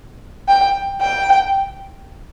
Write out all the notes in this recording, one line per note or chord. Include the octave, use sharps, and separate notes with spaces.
G5
G5